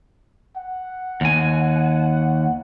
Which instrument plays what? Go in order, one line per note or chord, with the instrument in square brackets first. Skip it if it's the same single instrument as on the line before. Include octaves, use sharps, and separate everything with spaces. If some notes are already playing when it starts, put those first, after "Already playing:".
[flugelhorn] F#5
[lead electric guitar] D#2 G#5